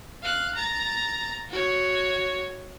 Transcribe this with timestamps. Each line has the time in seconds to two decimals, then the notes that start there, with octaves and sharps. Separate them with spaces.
0.22 F5 F#6
0.55 A#5 A6
1.49 F#4 C#5